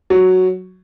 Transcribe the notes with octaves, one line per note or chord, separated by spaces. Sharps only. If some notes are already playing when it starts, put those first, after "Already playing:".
F#3